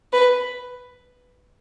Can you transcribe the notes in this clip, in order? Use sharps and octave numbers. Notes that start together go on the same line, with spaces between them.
B4